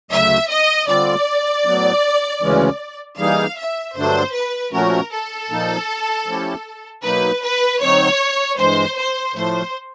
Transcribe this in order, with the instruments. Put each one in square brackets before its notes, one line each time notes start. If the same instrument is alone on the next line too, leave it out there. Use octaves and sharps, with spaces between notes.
[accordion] D2 C#3 F#3 A3 [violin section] E5
[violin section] D#5
[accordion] D3 G3 C4 F4 [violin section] D5
[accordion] A2 F#3 B3
D2 C#3 E3 G#3 C#4
[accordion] E3 G3 A#3 D#4 G#4 [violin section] F5
[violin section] E5
[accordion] G2 D3 F#3 A3 D4 [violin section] C5
[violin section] B4
[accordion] A#2 F3 A3 C#4 F#4 [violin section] A#4
[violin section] A4
[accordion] A#2 F3 A#3 D#4
F3 A3 C#4 E4 G4
[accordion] B2 F#3 A#3 D#4 [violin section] B4
[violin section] B4
[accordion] D3 F#3 A3 C4 D#4 [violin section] C#5
[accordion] G2 E3 G#3 [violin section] C5
[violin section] C5
[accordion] A2 F3 A3 [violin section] C5